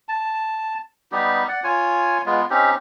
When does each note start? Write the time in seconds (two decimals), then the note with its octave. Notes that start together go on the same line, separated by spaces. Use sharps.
0.08 A5
1.12 G3 B3 D#4 G4
1.48 D5 F#5
1.64 F4 C#5 G#5
2.26 G#3 B3 F4
2.50 C4 C#4 D#4 G4